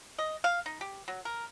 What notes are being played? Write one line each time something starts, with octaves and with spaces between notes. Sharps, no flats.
D#5
F5
D#4
G4
F#3
A#4